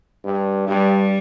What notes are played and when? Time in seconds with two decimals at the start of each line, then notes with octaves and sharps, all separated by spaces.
0.24 G2
0.68 G2 G3